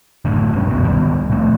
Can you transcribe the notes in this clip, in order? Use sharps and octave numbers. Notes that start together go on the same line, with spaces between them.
F#1 A2 D3
F#2 A#2 G3 C#4
F1 C2 G2 B2
D1 D#3 G3 B3
A#2 F3 A3 C4